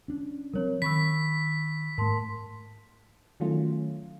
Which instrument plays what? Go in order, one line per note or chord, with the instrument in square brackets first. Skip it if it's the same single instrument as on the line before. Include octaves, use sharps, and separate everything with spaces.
[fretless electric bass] C#4 D4
[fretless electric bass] F3 F#3 C4 [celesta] A#4 C#5
[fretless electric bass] D#3 [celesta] B5 C#6 E6 [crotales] B6
[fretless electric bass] G#2 A3 [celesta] A#4 A5 C6
[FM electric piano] D#3 F#3 A3 C#4 F4